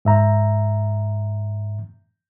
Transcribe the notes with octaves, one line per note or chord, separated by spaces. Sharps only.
G#2 E5 A#5